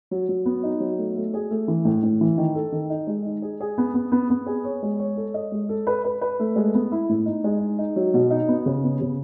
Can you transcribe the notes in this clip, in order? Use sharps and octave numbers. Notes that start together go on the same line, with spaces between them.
F#3
F#3
B3
D#4
F#3
A3
A3
G#4
A3
E3
A2
A2
E3
D#3
A4
D#3
D#4
G#3
D#4
G#4
G#4
B3
B3
B3
B3
G#4
C#5
G#3
C#5
A4
D#5
G#3
A4
B4
B4
B4
A3
G#3
B3
E4
A2
D#4
G#3
D#4
D#4
F#3
B2
D#4
B3
C#3
B3
C#3